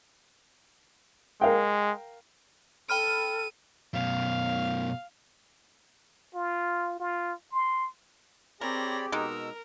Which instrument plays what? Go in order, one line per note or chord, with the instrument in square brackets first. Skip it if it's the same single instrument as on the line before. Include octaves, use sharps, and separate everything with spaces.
[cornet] G#3 [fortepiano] A#4 F5 G5
[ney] A4 [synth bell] G5 B5 F6 [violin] D#7
[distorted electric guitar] F#2 B2 [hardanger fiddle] F5
[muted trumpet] F4
F4
C6
[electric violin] C4 A#6 [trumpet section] G4 G#4 [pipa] A#4 [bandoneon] C#5 D5 B5
[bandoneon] B2 E6 [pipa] G#3 D#4 [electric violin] A#4